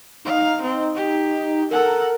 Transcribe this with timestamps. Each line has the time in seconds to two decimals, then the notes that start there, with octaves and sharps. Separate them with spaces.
0.25 D#4 F5
0.62 C4
0.95 G4
1.71 A4 A#4 F#5